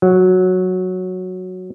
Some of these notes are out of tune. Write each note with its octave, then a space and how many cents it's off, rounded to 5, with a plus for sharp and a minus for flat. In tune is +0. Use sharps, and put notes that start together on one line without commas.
F#3 -5